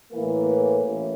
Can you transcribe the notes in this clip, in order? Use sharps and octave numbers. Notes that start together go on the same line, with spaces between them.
A2 E3 A#3
A1